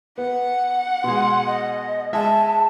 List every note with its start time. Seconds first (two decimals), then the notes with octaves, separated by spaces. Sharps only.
0.18 B3 F#5
1.04 B2 G#3 C6
1.47 D#5
2.13 G#3 E5 A5